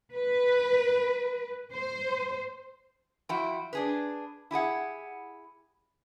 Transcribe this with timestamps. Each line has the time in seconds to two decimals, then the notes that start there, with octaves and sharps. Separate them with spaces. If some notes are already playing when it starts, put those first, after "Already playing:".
0.15 B4
1.72 C5
3.29 F3 E4 F#4 G5
3.73 D4 G#4 B4
4.51 E4 G4 G#4 F#5